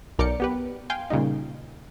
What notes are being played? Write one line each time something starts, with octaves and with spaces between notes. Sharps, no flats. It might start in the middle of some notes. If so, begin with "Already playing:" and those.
B1 A#4 D5 D6 G6 C#7
B3 G4 B4
F5 G5 G#5 C6
A#2 C#3 G3 D#4